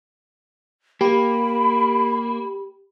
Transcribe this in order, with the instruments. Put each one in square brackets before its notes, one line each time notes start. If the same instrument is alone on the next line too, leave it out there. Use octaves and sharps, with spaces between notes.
[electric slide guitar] A#3 [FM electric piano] G4 [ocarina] B5